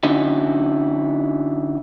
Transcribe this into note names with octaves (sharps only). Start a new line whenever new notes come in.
D3 C#4 D#4 E4 F#4